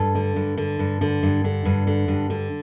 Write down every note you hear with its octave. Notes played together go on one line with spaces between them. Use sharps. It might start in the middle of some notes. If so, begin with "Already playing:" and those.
Already playing: G2 A4
D3
G2
D3
G2
D3
G2
D3
G2
D3
G2
D3